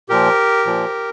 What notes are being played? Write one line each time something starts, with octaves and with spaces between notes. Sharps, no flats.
A#2 F3 G4 A#4
A#2 F3